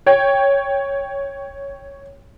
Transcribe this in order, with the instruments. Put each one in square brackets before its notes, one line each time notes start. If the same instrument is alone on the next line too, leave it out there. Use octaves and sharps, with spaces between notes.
[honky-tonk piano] C#5 G5